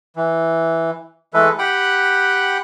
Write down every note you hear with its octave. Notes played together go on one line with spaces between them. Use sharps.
E3
E3 G#3 A3 A4 B4
G4 F#5 G5 B5 F#6